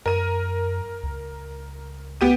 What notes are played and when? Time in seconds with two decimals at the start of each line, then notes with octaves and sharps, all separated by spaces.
0.06 F#2 A#4 D#7
1.03 C#2
2.21 B3 G4 D#7